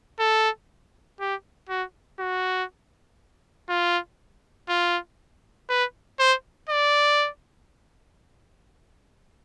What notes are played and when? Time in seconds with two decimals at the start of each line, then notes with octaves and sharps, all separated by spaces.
0.20 A4
1.20 G4
1.69 F#4
2.19 F#4
3.69 F4
4.69 F4
5.69 B4
6.19 C5
6.69 D5